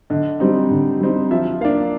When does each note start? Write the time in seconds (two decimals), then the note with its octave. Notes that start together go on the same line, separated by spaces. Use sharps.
0.10 D3 D#5
0.40 G3 C4 D#4
0.71 D3
1.00 G3 C4 D#4
1.31 F3 E5
1.61 A#3 D4 F5